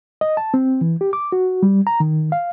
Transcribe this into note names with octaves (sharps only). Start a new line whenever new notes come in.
D#5
A5
C4
E3
G4
D6
F#4
G3
A#5
D#3
F5